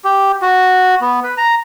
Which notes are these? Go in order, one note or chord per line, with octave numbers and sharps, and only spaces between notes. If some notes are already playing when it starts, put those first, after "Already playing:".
G4
F#4
B3
B4
A#5